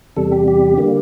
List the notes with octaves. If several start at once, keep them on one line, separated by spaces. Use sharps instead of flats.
E2 C3 G3 A4
G4
G4
D3 G3 A#3